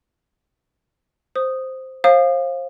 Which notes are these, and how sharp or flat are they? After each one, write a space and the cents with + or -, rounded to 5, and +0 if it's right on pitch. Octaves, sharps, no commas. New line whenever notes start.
C5 +0 D#6 -5
C5 +35 F5 +0 D#6 -35